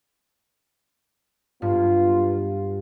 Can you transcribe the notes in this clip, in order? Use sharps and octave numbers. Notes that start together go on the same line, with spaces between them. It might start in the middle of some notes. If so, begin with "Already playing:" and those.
G2 B3 F4